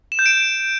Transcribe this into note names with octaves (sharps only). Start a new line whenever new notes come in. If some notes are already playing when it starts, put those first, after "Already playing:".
E7
G6
D7